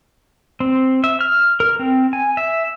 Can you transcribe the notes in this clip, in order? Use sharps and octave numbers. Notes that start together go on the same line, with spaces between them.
C4
E5
F6
A#4
C4
G#5
E5